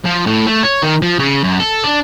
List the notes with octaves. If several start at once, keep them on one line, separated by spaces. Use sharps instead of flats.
F3
A2
A3
C#5
D#3
F3
C#3
F#2
A4
D4